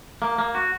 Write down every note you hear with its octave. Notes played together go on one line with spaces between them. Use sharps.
A#3
A#3
F#4